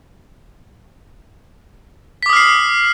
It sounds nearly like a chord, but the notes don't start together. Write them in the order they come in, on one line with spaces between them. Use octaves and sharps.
B6 D6 D#6 F6 C7